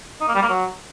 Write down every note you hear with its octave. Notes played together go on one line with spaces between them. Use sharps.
D#4
A#3
G3
A#3
F#3